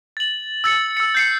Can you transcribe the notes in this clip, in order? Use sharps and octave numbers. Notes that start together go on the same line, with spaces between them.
A6 F#7
E6 A6 C#7 F#7
E6 C#7
G6 C7 C#7